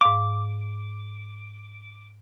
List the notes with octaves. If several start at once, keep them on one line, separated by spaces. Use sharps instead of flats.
G#2 F5 D6